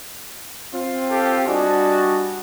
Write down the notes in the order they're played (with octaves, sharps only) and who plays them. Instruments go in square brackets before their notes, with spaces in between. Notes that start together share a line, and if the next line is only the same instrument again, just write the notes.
[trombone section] C4 F4
[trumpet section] G4 A4 F5
[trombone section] G3 D4 F#4 [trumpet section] D#5 G#5 A5